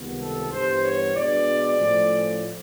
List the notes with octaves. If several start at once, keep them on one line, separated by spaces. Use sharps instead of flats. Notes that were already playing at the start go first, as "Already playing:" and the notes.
Already playing: C#2 C3 D#3 G3 B3
A4
G2 E3 G3 B3 C5
C#5
B2 G#3 B3 D4 D5
A2 F3 A3 C#4